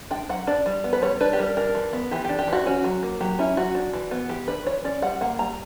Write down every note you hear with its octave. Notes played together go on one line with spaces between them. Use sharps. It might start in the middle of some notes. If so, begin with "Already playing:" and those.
D4 G5
F#3 F#5
D4 D5
G3
B3
B4
G3 C#5
D4 B4
G4
G3 A#4
D4 A#4
E3
B3
E3 G4
D4 G4
G4
E3 F#4
C#4 F#4
F#3
A#3
F#3 G4
C#4 E4
F#3 F#4
D4
E3
B3
E3 G4
D4 B4
E3 C#5
C#4 D5
G3 F#5
A#3 F#5
G3 A#5